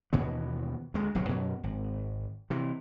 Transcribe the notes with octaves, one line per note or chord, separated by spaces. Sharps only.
D#2 B2 E3 B3
D2 G#3
D1 B1 C3 F#3
F#2 B2 F#3
G#1
C3 E3